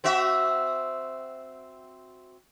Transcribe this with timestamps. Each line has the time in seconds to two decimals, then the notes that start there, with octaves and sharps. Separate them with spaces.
0.04 C4 F#4 E5